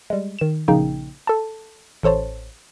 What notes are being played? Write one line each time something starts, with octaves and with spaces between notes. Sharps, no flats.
G3 G#3
D#3 E7
A#1 C#3 A#3 D#4 G5
A4 A5
A1 A4 C5 C#5 A5